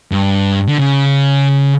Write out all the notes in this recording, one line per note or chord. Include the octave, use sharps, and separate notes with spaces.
G2
D3
C#3